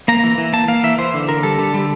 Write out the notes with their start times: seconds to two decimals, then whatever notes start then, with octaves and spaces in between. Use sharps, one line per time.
0.08 A#3 A#5
0.24 E3
0.38 E3
0.53 A#3 A5
0.68 A#3 F5
0.83 E3 E5
0.98 E3 C5
1.14 D3
1.29 D3 A#4
1.43 G3 A4
1.59 D3
1.74 G3